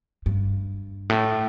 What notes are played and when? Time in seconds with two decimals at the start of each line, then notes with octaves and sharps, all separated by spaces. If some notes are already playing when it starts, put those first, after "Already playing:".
0.26 G2
1.09 A2